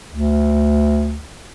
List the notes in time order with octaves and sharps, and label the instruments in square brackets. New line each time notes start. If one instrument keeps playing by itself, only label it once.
[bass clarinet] D2